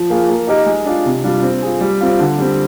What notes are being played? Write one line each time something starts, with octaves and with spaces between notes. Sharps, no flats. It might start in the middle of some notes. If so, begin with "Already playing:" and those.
Already playing: F3
A#3 F4 G#4
A#3
D#4 G4 A#4 D#5
G#3
D4 F4
C3
G3 D4 F4
C4
F4 G#4
G3
C4 F4
D3
G3 C4